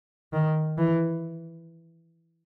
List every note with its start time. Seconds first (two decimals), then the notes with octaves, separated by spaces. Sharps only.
0.33 D#3
0.78 E3